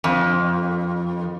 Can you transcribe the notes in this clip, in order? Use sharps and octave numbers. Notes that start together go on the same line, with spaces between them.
F2